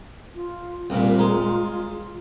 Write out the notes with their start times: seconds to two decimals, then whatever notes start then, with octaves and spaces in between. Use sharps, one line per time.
0.35 F4
0.90 C2 A#2 F4 B5
1.19 G#3 A#5
1.67 F4
1.87 F4